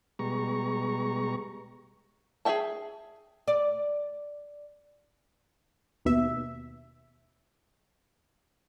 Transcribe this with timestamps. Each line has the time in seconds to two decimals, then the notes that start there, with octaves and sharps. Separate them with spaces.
0.19 B2 G3 G#3 A#5 C#6
2.45 G#4 A#4 E5 G5 A5
3.48 D5
6.05 D#2 B2 E5